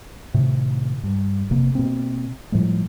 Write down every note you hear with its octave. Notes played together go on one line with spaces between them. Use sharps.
A2 C3 D#3
G2
F1 C3 A#3
B2 A#3 C4
A2 F3 G3 G#3